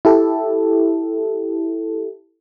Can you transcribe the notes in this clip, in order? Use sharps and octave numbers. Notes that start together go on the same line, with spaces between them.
E4 G4 A4